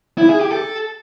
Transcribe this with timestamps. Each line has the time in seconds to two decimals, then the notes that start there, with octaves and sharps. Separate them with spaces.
0.18 E4
0.29 G#4
0.40 G4
0.52 A4